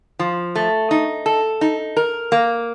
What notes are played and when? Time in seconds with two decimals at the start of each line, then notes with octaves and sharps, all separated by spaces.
0.19 F3
0.56 A3
0.91 D#4
1.26 A4
1.61 D#4
1.97 A#4
2.32 A#3